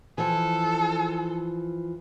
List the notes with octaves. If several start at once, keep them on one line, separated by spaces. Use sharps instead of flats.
E3 F3 A4